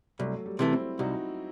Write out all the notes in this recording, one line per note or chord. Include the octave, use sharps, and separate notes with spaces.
C2 F#3 A3
A3
G3
C3 E3 A3
C4 E4
C2 D#4 F#4